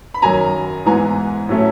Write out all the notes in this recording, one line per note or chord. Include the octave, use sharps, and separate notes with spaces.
B5
F#2 D#3 F#3 G#5 A#5
G#2 E3 G#3 B3 G#5 A#5
A2 F#3 A3 C#4